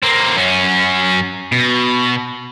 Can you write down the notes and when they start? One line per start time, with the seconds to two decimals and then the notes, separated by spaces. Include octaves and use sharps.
0.03 A#3 C4
0.36 F#2 C#4
1.52 B2